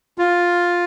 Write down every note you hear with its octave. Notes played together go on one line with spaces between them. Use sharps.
F4